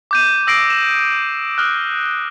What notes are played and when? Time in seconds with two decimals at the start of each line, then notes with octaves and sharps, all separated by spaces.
0.11 D6 G6 D#7
0.47 D#6 E6 A#6 C7 D7
0.70 E7
1.58 D#6 F6 F#6